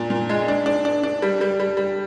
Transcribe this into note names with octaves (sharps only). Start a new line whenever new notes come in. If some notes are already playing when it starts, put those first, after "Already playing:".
Already playing: A#2 D4
A#2
G#3
D4
D4
D4
D4
G3
G3
G3
G3